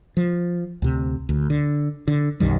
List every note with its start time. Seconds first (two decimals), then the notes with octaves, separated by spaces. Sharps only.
0.17 F3
0.82 D2 C3
1.29 D2
1.50 D3
2.08 D3
2.40 B1 F#2 D#3 G3